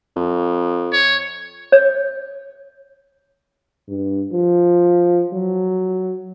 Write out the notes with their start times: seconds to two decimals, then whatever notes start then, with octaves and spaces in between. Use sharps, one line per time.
0.16 F2
0.93 C#5
1.72 C#5
3.88 G2
4.32 F3
5.34 F#3